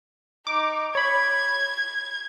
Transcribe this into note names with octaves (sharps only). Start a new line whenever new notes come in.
D#4 D6
C#5 B5 G#6